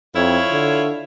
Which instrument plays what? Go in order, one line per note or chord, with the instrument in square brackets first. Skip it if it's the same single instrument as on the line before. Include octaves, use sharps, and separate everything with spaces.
[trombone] F2 [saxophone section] E4 F4 C#5
[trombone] D3